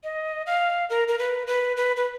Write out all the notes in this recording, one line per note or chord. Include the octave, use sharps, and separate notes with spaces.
D#5
F5
A#4
A#4
B4
B4
B4
B4